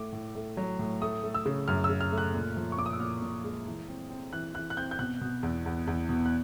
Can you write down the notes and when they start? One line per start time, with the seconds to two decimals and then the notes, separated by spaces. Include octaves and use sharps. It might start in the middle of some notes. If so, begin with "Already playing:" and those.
Already playing: A2 A3 D6
0.13 A2
0.35 A3
0.57 F#3
0.79 A2
1.02 A3 D#6
1.24 A3
1.34 E6
1.46 C#3
1.68 F#2 F6
1.84 E6
1.89 C#3
2.01 F6
2.12 A3
2.18 F#6
2.34 A#2
2.57 F3
2.72 C#6
2.78 A#2 D6
2.86 D#6
2.93 E6
3.00 A#2 F6
3.22 A#2
3.44 G#3
3.67 E3
3.89 C4
4.10 C4
4.33 E3 F#6
4.54 E3 F#6
4.70 F#6
4.77 C4 G6
4.91 G6
4.99 B2 F#6
5.21 B2
5.43 E2
5.66 E2
5.87 E2
6.09 B2
6.26 F#6